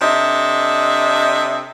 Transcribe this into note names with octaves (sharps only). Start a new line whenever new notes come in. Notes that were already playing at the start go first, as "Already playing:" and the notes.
C3 D4 A4 D#5 E5